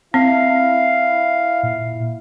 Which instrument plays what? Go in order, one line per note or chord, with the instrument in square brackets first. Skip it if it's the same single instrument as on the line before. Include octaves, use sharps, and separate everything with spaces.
[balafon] C4 [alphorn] E4 [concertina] F5
[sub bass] A#2